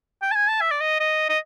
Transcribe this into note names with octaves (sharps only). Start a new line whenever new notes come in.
G5
A5
G#5
A5
E5
D5
D#5
D#5
D#5